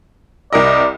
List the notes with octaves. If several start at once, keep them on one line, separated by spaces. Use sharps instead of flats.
C2 A#4 D5 D#5